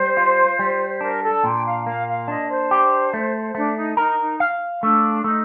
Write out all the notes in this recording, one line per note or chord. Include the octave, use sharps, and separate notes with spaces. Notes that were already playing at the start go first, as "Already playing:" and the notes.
Already playing: G3 C5
F4
G3
D4 A#4
A4
A#2 G5
F5
A#3 F5
F5
D4 D#5
C5
G4
A3
A3 D4
D#4
D#4 A#4
D#4
F5
A3 D4
A3 D#4